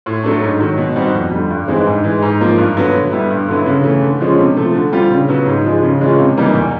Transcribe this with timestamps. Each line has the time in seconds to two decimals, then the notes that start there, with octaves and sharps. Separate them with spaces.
0.06 A2
0.23 F#3 A3 D4
0.42 G#2
0.59 D#3 F#3
0.77 B2
0.96 G3 C4 D#4 F#4
1.13 F2
1.31 D3 G3
1.50 G2
1.68 E3 G#3 C4 D#4
1.86 G#2
2.04 E3 G#3
2.22 G#2
2.40 F3 A#3
2.58 G2
2.77 D3 F#3 B3
2.93 D3
3.11 G3 B3 E4
3.30 G2
3.48 D3 F#3 B3 E4
3.66 C#3
3.84 E3 A3
4.02 D3
4.21 F3 G#3 C#4
4.39 C3
4.57 F3 A3
4.75 D3
4.92 G3 C4 F4
5.10 C#3
5.28 F#3 B3
5.46 G#2
5.65 F3 G#3
5.82 C#3
6.00 E3 G#3 C#4 F4
6.18 C3
6.37 E3 G3 A#3 D#4
6.54 E2